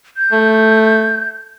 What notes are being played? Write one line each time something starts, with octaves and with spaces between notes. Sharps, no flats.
G6
A3